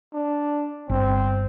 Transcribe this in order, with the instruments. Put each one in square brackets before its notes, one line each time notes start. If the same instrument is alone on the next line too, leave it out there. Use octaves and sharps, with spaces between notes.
[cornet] D4
[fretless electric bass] G1 [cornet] C4